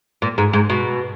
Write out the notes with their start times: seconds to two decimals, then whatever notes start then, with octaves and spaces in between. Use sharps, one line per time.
0.22 A#2
0.38 G#2
0.53 G#2
0.70 B2